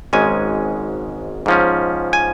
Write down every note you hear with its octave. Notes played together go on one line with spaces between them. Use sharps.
G#1 G#2 G#3 C#4 G#5
G#2 F3 C#4
G#5